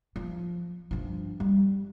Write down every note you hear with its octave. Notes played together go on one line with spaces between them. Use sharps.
F3
G2 F3
G3